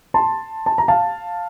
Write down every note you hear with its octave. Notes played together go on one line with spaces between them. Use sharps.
A5 C6
A5
A#5
F5 A5